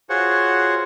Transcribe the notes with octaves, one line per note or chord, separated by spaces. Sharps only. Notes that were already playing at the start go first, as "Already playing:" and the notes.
F4 F#4 G#4 C5 C#5 F#5